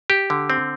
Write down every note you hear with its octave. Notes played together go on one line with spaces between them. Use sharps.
G4
D3
C4